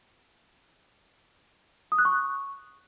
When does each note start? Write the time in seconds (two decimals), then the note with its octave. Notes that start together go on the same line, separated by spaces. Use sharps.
1.92 D#6
1.98 F#6
2.05 C#6